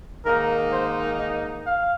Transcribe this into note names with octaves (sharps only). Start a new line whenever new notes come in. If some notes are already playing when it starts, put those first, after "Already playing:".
G#2 D#3 A#3 D#4 A#4
C5
D#5
F5